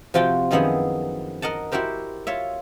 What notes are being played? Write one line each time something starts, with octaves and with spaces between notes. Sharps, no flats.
C3 F3 F4 F#4 G5 A5
F#2 D#3 F3 B3 E4 G#4
A#4 D#5 F#5 A5
E4 F#4 G4 A#4 C5
F4 C#5 E5